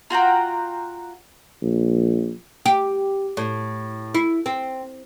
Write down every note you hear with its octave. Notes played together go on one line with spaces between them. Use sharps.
F4 F#4 G5 A#5
A#1
G4
A2
E4
C4